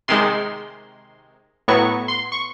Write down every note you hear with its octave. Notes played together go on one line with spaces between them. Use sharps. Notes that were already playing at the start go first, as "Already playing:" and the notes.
C3 D#3 G#3 C6
A2 F#3 B3 C#6
C6
C#6